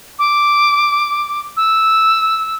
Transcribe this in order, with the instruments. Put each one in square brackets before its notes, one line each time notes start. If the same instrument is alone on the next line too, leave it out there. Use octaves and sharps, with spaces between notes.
[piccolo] D6
E6